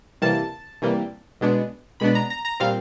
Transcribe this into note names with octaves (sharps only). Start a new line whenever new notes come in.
C3 E3 G3 A#3 A5
C3 E3 G3 A#3
B2 G#3 B3 D4
B2 G#3 B3 D4 B5
A#5
A#5
A#5
A#2 G3 C4 F5